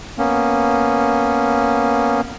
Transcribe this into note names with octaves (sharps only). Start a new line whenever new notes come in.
A#3 B3 C#4